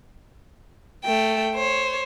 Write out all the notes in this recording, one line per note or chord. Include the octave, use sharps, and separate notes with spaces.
A3 G5
C5 C#5